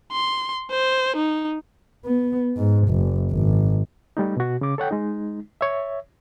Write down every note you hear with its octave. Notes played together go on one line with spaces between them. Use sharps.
C6
C5
D#4
B3
G#2
F#1
G#1
G3 A3 D#4
B2 F#4
C#3 D6
A4 C#5 F#5 G5
G#3 D#4
C#5 E5